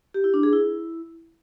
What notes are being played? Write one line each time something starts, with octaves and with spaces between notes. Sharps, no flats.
G4
E4
D4
G#4
E4